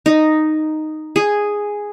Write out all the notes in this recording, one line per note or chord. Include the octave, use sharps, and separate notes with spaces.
D#4
G#4